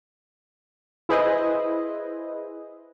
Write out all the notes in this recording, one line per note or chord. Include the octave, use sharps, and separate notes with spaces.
E4 G#4 B4 C5 D#5